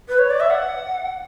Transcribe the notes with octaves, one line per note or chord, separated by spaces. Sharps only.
B4
C#5
D5
E5
F#5